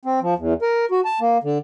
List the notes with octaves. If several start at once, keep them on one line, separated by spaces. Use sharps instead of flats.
C4
F3
E2
A#4
F#4
A5
A#3
D3